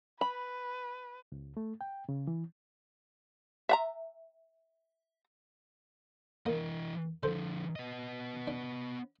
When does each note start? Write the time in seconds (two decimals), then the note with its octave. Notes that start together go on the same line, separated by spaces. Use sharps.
0.21 B4 B5
1.32 C#2
1.57 A3
1.81 G5
2.09 C#3
2.27 E3
3.69 E5 F#5 A#5
6.46 E3 A#3 D#5
7.23 D3 F3 A4 C5
7.76 B3 D#5
8.47 D4